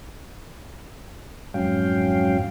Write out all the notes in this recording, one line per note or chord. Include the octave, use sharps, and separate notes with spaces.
F2 G#2 F#3 C#4 F5 G5